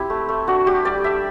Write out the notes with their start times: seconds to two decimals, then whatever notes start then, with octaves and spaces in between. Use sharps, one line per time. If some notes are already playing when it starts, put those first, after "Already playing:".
Already playing: C4 E4 G4
0.10 A3
0.29 A3
0.47 D4 F#4
0.66 G3 G4
0.85 G3 D5
1.04 D4 E5